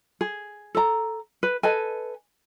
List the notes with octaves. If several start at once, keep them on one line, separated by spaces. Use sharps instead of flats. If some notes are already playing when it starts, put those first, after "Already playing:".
G#4
A4 A#5
B4
A4 B4 D#5 G#5